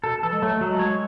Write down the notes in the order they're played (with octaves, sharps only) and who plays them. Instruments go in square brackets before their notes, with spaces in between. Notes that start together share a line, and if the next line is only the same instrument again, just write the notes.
[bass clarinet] B2 [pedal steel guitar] A4
[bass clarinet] E3 [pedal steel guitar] A4
[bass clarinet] G#3
[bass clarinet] F#3 [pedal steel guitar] A3
[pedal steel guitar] F#3
[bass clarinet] G#3
[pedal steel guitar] C#5